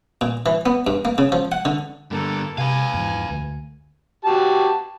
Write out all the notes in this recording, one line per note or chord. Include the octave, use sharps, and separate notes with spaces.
A#2
E3
B3
G2
A#3
C#3
F3
F#5
D3
G2 D3 A#3 A4
C3 B4 F5 G#5
E2 G#2 F3
D2
F#4 G4 A5